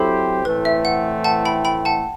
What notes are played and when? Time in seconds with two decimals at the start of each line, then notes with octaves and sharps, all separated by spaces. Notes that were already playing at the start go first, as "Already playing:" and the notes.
Already playing: F#3 C4 E4 G4 A4 C5
0.44 A2 E3 A3 C4 B4
0.65 E5
0.85 F#5
1.24 F#5 A5
1.45 G5 B5
1.65 G5 B5
1.85 F#5 A5